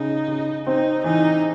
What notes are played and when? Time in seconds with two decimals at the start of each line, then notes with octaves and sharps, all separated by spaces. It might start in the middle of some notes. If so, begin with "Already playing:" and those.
Already playing: C#3 D#4
0.28 C#3
0.66 C4 D#4
1.04 E3 D#4